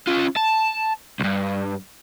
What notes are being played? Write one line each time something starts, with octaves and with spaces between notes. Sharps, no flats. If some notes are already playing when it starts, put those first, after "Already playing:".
C#4 F4
A5
C2 G2